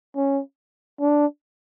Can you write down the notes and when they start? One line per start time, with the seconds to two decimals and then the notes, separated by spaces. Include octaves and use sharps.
0.16 C#4
1.00 D4